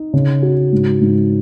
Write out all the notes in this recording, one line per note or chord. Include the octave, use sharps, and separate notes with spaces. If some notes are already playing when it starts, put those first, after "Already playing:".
Already playing: D#4
C#3
F#4
G#2
G#2